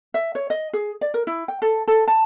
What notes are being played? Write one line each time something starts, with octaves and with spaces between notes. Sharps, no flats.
E5
C#5
D#5
G#4
D5
A#4
E4
G5
A4
A4
A5